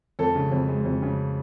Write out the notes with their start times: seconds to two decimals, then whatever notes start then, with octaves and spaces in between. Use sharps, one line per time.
0.19 F2 A4
0.35 C#3
0.52 F2
0.68 G#3
0.85 F2
1.02 C#3